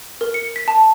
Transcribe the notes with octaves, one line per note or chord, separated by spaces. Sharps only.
A#4
C#7
B6
A5